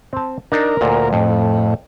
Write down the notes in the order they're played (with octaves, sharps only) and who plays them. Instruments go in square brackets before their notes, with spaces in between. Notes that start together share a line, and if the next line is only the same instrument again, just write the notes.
[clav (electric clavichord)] C4 A5
[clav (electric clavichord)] D4 D#4 [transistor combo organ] A#4
[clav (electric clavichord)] D2 A#2
[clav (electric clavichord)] F2 [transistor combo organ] A2